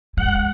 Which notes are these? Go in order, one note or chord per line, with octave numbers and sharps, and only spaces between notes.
G#3 F#5